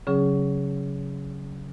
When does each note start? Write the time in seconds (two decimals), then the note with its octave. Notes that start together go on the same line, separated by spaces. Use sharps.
0.07 C#3 F#3 C#4 G#4